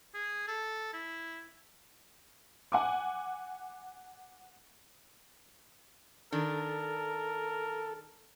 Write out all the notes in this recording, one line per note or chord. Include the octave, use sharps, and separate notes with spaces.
G#4
A4
E4
F#5 G#5 D6
D#3 D4 A4 A#4